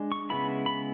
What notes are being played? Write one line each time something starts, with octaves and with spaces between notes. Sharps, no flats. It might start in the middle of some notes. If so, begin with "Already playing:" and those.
Already playing: G#3 D4
C#6
C#3 G#3 B3 E4 B5
B5